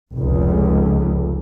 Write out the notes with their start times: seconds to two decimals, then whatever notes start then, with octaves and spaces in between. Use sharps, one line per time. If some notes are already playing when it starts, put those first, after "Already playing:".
0.14 F1 C#2